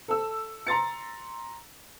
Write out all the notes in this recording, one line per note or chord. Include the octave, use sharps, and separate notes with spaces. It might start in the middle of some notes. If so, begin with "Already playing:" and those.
A4 E6
A#5 C6 A6 C#7